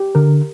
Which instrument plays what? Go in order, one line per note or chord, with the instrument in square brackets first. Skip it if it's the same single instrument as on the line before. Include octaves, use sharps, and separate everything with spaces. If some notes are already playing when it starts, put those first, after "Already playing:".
Already playing: [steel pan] G4
[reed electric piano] D3 [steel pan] A#4